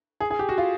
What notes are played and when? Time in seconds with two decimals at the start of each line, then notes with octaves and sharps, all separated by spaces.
0.20 G#4
0.31 G#4
0.39 G4
0.49 F#4
0.58 F4